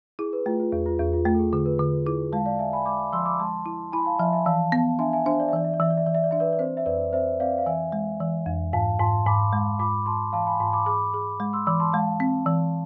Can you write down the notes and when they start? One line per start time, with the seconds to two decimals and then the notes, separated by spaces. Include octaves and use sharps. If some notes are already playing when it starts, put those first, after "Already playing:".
0.19 E4 G#4
0.33 B4
0.46 A3 F4
0.60 F4
0.72 E2 G#4
0.86 F4
0.99 E2 G#4
1.13 F4
1.25 A3 F4
1.34 A4
1.39 G#4
1.52 D3 G#4
1.65 B4
1.79 D3
2.06 E4 G#4
2.32 G#3 F5 A5
2.45 D5 F5
2.59 G#3 E5 G#5
2.73 G#5 B5
2.85 G#3 B5 D6
3.13 F3 C6 E6
3.26 B5 D6
3.40 G#3 A5 C6
3.66 E4
3.92 E4 G#5 B5
4.06 F5 A5
4.19 F3 E5 G#5
4.33 E5 G#5
4.46 E3 F5 A5
4.72 B3
4.99 D4 E5 G#5
5.13 E5 G#5
5.26 D4 C5 E5
5.40 D5
5.48 E5
5.53 E3 D5
5.64 E5
5.73 D5
5.80 E3 E5
5.90 D5
5.97 E5
6.06 E3 D5
6.15 E5
6.24 D5
6.31 D4 E5
6.40 B4 D5
6.53 D5
6.59 C4 C5
6.77 E5
6.86 F2 B4 D5
7.13 C4 C5 E5
7.40 C4 D5 F5
7.58 F5
7.66 E3 E5 G#5
7.92 G#3
8.20 E3
8.46 F2
8.73 G#2 F5 A5
8.99 G#2 A5 C6
9.26 G#2 B5 D6
9.53 G#3
9.80 G#2 B5 D6
10.06 G#2 A5 C6
10.33 E3 F5 A5
10.47 G#5 B5
10.59 G#2 A5 C6
10.73 B5 D6
10.86 G#4 B5 D6
11.14 G#4
11.40 G#3
11.53 C6 E6
11.66 E3 B5 D6
11.80 A5 C6
11.93 G#3 F5 A5
12.20 C4
12.46 E3